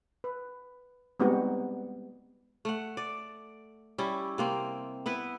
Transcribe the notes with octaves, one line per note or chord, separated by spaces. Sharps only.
B4
G3 G#3 B3 C4 D#4 F#4
A3 F#5
D5
G3 C#4 E4
C3 A#3 C4
B3 E4 B4